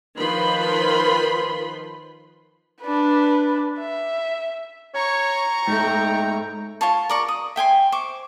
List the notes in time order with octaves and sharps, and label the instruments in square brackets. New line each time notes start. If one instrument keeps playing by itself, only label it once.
[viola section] D#3 F3 B4 B5 C6
[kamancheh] D4 B4
E5
[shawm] C#5 [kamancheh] A#5 C#6
[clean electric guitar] G#2 A3 [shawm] G5
[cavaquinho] F4 C#5 A5
A#4 D5 C#6
D#6
E5 G5 G#5 C6
C5 C#6 D6